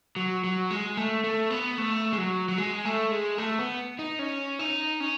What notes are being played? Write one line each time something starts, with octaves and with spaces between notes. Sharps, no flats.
F#3
F#3
G#3
A3
A3
B3
A3
G#3
F#3
F#3
G#3
A3
G#3
A3
B3
D#4
C#4
D#4
C#4